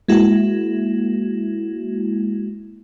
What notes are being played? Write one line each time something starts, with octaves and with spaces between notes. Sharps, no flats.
G#3 A#3 E4 F#4